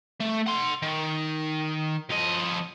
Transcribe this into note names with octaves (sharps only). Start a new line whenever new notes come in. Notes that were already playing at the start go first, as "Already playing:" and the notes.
A3
F#5 C6
D#3
F3 D#5